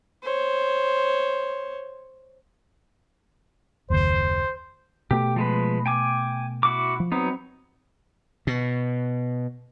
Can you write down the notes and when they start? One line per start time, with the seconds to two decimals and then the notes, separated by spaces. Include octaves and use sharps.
0.23 C5 C#5
3.90 F#1 D#2 C5
5.11 B2 A3 G4
5.36 F3 G#3 B4
5.86 G5 G#5 D6
6.63 E4 F#4 D6
7.00 F3
7.12 F#3 B3 C4 D#4
8.47 B2